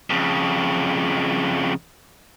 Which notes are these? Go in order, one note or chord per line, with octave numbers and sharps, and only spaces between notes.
F2 C#3